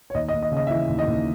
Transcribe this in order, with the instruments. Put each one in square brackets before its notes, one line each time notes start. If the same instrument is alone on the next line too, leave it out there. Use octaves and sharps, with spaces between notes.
[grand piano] C#5
D#2 D#5
D#5
D#2
D#5
C#3
D#5
E5
E3 D#5
D#2
D#5
D#2